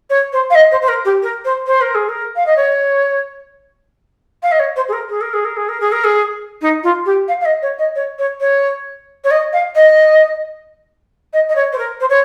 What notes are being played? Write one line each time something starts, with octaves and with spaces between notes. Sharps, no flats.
C#5
C5
F5
D#5
C5
C5
A#4
G4
A#4
C5
C5
A#4
G#4
A#4
F5
D#5
C#5
F5
D#5
C#5
C5
G#4
A#4
G#4
A#4
G#4
A#4
G#4
A#4
G#4
A#4
G#4
D#4
F4
G4
F5
F5
D#5
C#5
D#5
C#5
C#5
C#5
C#5
D#5
F5
D#5
D#5
D#5
C#5
C5
A#4
C5
C#5